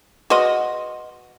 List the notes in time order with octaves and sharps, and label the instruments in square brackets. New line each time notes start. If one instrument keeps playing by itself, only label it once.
[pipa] F#4 D#5 [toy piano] G#4 B4 C6